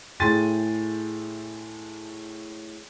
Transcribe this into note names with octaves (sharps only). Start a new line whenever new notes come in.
A2 G#4 G5 C6 A6 D#7